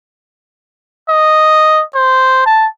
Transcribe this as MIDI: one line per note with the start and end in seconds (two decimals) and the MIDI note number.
1.09 1.83 75
1.95 2.45 72
2.46 2.67 81